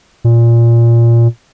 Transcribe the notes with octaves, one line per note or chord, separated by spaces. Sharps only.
A#2